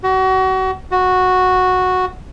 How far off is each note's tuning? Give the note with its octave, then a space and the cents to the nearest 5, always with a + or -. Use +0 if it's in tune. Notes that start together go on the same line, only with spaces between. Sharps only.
F#4 +30
F#4 -5